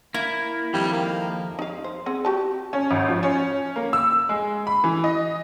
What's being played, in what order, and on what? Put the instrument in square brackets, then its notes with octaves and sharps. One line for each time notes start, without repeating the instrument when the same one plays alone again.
[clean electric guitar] A#3 [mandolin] E4
[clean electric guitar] F2 D#3 F3 [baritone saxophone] G3
[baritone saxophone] A#3
[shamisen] D#4 F5
C5
C4 G#4 F#5
F#4 G4 A5
[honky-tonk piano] C#4
G#1
F3
C#4
A#3
E6
G#3
B5
E3
D#5